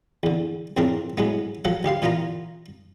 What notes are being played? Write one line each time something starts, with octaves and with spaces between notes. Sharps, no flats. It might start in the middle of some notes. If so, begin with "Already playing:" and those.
E2 D3
F2 A2 C#3 C4 D4 A#4
A2 F#3 G#3 B3
F3 F#3 A4 F#5
D2 G4 F5 C6
A#2 E3 B3 F4 A#4 A#5